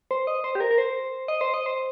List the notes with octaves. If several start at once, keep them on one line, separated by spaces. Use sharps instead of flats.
C5
D#5
C5
G4
A#4
A#4
C5
D#5
C5
D#5
C5